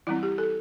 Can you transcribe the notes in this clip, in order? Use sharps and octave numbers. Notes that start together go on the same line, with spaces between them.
E3 G3 C4 E4
G4
A4